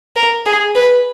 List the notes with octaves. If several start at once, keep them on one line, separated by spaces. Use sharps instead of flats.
A#4
G#4
B4